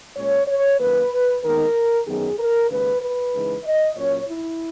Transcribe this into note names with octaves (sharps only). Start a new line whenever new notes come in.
A#2 G#3 C#4 C#5
C#5
F#2 D#3 A#3 B4
D#2 D#3 G#3 B3 D#4 A#4
F#2 D#3 F#3 B3 D#4 G#4
A#4
D#2 C#3 G#3 D#4 B4
B4
C#3 E3 G#3 D#4
D#5
A#2 F#3 C#4 C#5
E4